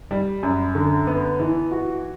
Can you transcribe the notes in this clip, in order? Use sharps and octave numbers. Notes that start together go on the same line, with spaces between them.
G3
F#2
D3
B3
E3
F#4